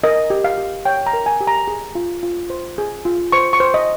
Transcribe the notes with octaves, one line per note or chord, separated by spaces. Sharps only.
A#4 D#5
G4
F5
G4
C#5 G5
A#5
A#4
G#5
G4
A#5
G#4
F4
F4
C5
G#4
F4
C5 C#6
C#6
C5
D#5